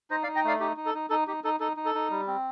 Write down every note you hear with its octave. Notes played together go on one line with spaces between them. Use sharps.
D#4 C5 D#5
D5 F5
D#4
D#5 G5
A3 D5 F5
D#4 G4
D#4
A4
D#4
D#4 A4
D#4 G4
D#4 A4
D#4 A4
D#4
A4
D#4
G3
C4